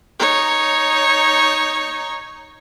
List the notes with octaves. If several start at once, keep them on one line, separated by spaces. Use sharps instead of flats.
D#4 C#5